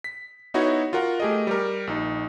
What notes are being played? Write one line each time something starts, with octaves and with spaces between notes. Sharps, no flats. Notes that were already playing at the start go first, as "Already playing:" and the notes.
B6
B3 D#4 E4 F#4 C#5
F4 F#4 A#4 F#5
A3 G4 G#4 A#4 D#5
G3 G4 A#4
A#1 D#4